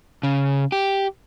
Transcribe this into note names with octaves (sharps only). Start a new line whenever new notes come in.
C#3
G4